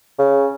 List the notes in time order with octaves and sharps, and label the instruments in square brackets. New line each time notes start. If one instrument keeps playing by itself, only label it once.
[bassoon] C#3